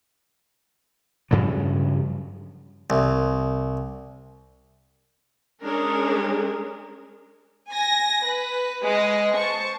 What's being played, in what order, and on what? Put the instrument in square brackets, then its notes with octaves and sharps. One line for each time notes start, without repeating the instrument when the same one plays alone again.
[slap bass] G2 C#3 F3 F#3
[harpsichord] C2
[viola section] G#3 C#4 D4 G#4 A#4
[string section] G#5 A#6
B4
G#3 B4 D#5
C5 A5 C#6